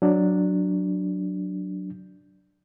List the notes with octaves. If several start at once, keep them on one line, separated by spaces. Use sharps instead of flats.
F#3 D4